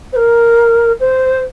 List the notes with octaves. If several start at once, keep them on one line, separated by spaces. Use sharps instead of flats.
C5
A#4
C5